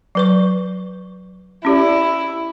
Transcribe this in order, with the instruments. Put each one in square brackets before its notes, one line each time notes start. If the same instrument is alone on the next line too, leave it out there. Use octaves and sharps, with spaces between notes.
[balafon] F#3 B4 C#6
[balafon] C#4 G4 D5 [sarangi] E4